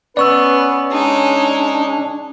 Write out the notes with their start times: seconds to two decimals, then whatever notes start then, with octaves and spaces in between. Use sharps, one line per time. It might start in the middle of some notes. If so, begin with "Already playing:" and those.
0.17 B3 C#4 B4 D5 C#6 E6
0.91 G#3 D4 D#4